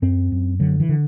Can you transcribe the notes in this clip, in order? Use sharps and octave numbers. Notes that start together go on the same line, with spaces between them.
F#2 C4
F#2
D3 F#3
E3
D3